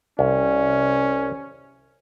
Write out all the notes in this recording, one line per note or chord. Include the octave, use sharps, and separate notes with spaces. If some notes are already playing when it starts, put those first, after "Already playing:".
C2 C#4